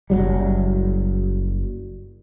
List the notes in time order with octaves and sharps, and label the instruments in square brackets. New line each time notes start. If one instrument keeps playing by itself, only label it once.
[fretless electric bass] F#1 C#2 F#3 G3